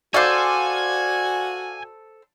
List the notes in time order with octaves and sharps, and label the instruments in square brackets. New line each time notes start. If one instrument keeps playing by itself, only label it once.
[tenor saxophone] F#4 [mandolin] A4 C5 [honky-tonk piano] D5 F5 D6 [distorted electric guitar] G#5